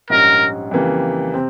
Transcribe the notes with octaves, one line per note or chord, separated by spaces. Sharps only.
A#1 G#2 G3 C#4 A#4
F2 C#3 E3 G3 A#3
C3 C4